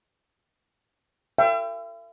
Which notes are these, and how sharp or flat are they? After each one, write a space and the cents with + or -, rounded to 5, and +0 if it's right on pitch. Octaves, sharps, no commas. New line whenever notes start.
E5 +45 G5 +0